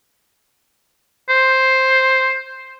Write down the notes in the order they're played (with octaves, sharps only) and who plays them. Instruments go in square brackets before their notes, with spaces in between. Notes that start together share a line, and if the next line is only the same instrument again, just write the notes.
[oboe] C5